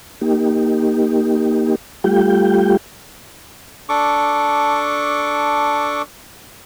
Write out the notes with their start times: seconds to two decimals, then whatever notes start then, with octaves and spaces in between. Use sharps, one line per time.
0.21 A#3 D#4 G4
2.04 G3 A3 F4 G4 G5
3.89 D4 A4 C#6 D6